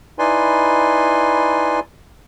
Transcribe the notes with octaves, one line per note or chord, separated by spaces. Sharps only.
D#4 E4 B4 D5 G#5 C6